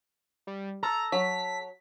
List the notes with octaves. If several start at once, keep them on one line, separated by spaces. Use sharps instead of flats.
G3
A4 A#5
F#3 B6